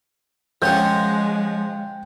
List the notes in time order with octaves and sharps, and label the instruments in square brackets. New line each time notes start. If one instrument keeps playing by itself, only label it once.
[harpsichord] F3 C#4 F#5 [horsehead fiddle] G#3 [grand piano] G5 G6